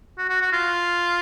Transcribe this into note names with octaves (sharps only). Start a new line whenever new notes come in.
F#4
F#4
F#4
F4